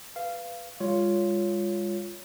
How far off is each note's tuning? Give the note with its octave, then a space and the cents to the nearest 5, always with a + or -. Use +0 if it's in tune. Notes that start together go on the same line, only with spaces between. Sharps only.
B4 +0 F5 -15
G#3 -40 F4 +0 C#5 +5